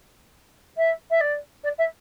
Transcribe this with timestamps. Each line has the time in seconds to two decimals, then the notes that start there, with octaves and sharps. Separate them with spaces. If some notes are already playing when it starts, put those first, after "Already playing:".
0.77 E5
1.10 E5
1.20 D5
1.63 D5
1.78 E5